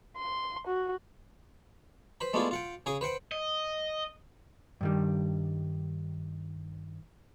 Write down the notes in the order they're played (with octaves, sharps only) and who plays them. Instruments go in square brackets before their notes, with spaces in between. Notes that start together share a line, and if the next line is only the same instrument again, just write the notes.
[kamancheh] C6
F#4
[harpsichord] B4 C5 B5
G#3 A3 B3 D4 E4 F4
F4 F#5 G5
C#3 G#4 G#5 D#6
B4 C5 F#5 G5
[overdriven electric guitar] D#5
[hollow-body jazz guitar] G2 D#3 G3